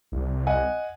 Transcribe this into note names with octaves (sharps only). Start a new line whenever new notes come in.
C2
D#5 F#5 G#5